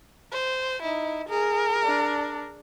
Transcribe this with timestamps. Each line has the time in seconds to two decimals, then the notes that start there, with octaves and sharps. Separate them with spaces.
0.32 C5
0.83 D#4 E4
1.29 G#4 A#4
1.85 D4